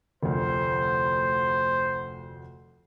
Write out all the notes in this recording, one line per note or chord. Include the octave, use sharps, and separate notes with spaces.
F1 D2 C5